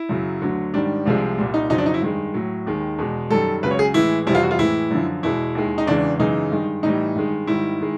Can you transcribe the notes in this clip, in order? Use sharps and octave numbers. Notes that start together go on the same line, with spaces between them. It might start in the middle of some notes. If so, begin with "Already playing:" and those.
Already playing: E4
F#2 C#3 F#3
D2 D3 F#3
G#2 D#3 G3 D4
C2 C3 F3 G#3
C2 A#2 G3
D#4
F2 C#3 F#3 D#4
D4
D#4
E4
G2 D#3 G#3
A2 F#3
D#2 D#3 G#3
E2 B2 G#3
F#2 D#3 G3 A4
C#2 C#3 F#3 B4
C#5
G#4
A2 E3 G#3 E4
F2 C3 E3 G3 E4
F4
F#4
F4
A2 E3 G#3 E4
F#2 D3 F3
E2 B2 G#3 E4
D#2 D#3 G#3
D#4
E2 C#3 E3 G#3 D4
F#2 C#3 E3 G#3 D#4
G2 D#3 G#3
A2 E3 G3 D#4
G2 D#3 G#3
G#2 D#3 G3 E4
D#3 G#3